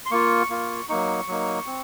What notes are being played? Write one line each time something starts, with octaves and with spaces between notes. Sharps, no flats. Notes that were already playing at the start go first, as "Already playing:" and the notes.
C6
A#3 F4 C#6
A#3 F4
F#3 A#3 D#4 C#6
F#3 A#3 D#4
C4